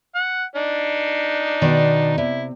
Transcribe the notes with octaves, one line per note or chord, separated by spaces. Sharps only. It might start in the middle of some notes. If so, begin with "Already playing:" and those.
F#5
D4 D#4
B2 D#3 D5
C3 E4